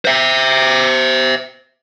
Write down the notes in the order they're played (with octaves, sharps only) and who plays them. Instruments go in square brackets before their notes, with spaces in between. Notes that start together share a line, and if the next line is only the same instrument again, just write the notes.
[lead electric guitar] C5 E5